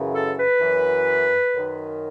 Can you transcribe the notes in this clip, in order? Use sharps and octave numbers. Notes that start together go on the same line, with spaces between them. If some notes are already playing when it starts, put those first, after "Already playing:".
Already playing: F#2 C#3 E3
A4
B4
F#2 E3
F#2 D#3